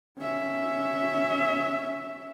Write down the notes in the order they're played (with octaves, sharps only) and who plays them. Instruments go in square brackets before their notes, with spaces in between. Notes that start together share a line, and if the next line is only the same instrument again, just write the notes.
[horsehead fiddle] C#4 E5